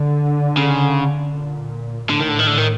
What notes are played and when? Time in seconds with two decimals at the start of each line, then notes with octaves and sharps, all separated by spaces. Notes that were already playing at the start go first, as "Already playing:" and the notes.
Already playing: D3
0.57 C#3
1.34 A#2
2.10 A2 D3
2.20 D#3
2.29 D3
2.39 D#3
2.47 D3
2.58 D#3